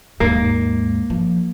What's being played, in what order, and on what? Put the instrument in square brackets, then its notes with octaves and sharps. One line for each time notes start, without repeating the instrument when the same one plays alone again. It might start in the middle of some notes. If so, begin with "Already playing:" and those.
[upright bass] D#2 G#2 [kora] A#3
[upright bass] F3